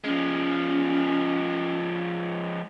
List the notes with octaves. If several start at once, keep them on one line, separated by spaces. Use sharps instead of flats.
F3 G#3 C#4